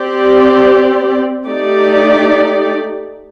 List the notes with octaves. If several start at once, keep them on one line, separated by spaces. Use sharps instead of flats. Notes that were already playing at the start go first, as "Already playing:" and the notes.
Already playing: C4 G4 D5
A3 D#4 G4 D5